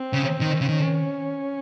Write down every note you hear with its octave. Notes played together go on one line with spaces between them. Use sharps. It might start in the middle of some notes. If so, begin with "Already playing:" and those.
Already playing: C4
C#3
D#3
C#3
D#3 C#4